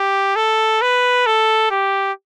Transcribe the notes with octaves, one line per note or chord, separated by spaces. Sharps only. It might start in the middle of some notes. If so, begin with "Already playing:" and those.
Already playing: G4
A4
B4
A4
G4